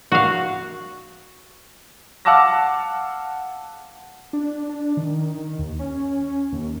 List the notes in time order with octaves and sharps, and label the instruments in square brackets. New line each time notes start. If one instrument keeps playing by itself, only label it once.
[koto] F#4 F5
[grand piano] F5 F#5 A5 D6 E6 A#6
[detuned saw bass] D4
D4
D#3
D#2
C#4
D#2